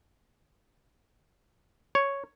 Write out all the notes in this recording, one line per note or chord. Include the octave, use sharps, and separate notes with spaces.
C#5